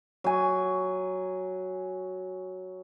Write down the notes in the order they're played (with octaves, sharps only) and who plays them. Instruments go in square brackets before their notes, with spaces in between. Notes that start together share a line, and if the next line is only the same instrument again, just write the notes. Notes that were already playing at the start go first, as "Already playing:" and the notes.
[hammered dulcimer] F#3 G#5